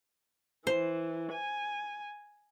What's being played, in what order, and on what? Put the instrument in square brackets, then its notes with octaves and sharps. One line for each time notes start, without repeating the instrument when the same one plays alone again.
[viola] E3 [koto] C5
[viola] G#5